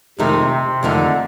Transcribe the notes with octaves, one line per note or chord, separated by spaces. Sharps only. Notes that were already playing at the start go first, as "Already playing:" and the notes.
F2 C3 D#3 A3 D#4 A#4
C3
F2 D3 D#3 A3 D#4 A#4